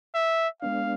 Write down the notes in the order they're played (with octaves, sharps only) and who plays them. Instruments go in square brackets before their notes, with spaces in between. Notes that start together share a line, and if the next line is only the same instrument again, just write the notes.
[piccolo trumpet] E5
[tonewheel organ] G#3 B3 D4 [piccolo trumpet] F5